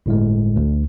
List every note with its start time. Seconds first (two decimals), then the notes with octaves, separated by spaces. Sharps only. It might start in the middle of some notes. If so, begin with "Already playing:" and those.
0.06 G1 A2 G#3
0.56 D2